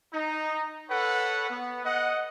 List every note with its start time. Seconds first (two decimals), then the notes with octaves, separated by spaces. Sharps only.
0.12 D#4
0.88 A4 B4 C#5 F#5
1.49 B3
1.84 D#5 F#5